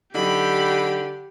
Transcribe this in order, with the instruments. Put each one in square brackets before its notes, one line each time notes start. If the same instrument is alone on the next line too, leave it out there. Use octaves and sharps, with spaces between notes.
[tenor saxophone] D3 [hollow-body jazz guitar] F#3 D#4 [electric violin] G4 G5 [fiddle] B5